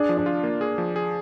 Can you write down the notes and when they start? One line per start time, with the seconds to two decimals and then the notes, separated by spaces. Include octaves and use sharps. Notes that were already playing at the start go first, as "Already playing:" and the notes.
Already playing: D4 G#4
0.09 F3
0.17 D4
0.26 F4
0.43 A#3
0.61 G#4
0.78 F3
0.96 G#4